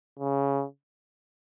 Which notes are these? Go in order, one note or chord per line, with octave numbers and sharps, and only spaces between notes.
C#3